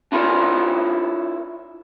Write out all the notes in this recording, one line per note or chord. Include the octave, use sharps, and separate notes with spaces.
D4 E4 F4 A#4 C#5 D5